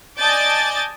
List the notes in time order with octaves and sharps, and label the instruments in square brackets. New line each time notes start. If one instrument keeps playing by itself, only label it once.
[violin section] D5 D#5 G#5 A5 G6 A6